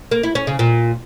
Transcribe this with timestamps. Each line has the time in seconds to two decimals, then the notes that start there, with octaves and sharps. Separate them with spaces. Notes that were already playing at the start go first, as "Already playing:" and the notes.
0.11 A#3
0.23 E4
0.35 C#4
0.47 C#3
0.59 A#2